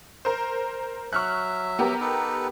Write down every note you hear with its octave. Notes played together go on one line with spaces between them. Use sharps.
A#4 C5
F#3 E5 C#6 F6 F#6
B3 G4 A#4
D#4 A4 B4